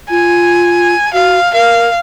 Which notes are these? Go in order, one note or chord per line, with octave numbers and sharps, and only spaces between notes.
F4 G#5
F#4 F5
A#4 F5